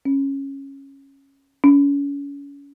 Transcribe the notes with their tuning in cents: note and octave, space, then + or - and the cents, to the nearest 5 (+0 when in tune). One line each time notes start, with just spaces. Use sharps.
C#4 -15
C#4 +35